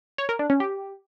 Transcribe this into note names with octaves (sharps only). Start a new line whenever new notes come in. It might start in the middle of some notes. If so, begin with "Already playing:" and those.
C#5
A#4
D4
C#4
G4